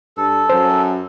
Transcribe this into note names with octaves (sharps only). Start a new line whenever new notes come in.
G2 A4
F#2 C5